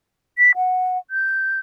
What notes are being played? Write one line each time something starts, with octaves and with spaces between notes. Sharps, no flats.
B6
F#5
G6